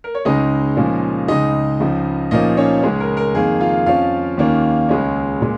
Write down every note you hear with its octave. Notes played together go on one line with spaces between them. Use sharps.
A#4
C#5
C#2 C#3 G#3 C#4 D#4 D#5
A#2 F3 G#3 C#4
C#2 C#3 G#3 D#4 D#5
C#2 C#3 F3
A#2 F3 A#3 C#4 D#4 D#5
C#4 C#5
C#2 C#3 G#3 C#4 G#4
A#4
A#4
F2 D#3 A#3 G#4
F4 F5
F2 F3 C#4 F4 F5
D#2 D#3 A#3 C#4
C#2 C#3 G#3 C#4
A#2 G#3